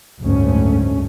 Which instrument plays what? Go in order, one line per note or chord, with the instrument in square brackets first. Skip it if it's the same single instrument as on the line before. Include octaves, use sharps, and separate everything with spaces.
[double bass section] F#1 D2 G#2 A3 C#4